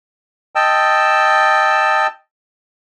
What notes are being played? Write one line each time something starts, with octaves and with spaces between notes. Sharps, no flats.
D#5 G5 A5 E6